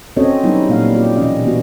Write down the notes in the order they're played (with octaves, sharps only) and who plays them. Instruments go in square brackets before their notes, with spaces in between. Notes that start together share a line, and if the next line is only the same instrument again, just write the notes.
[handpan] C4 C#4 F#4 A4 C#5 D#5
F#3 G3 B3 D#4 E4
A#2 G3 A#3 C4 F5
F4 G4
B2 E3 C#4 D#5
E3 B3 F#4